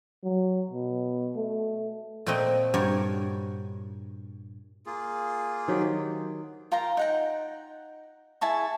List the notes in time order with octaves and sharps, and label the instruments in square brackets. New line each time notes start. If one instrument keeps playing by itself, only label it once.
[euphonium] F#3
B2
A3
[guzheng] A#2 A3 C4 A#4 D#5 G5
G2 F#4 G4 A#4 C#5
[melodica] A#3 F4 G#4
[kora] D#3 F#3 G4
[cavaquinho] F4 A#4 G5 A#5
D#4 F#5 G5
E4 G#4 A5 C#6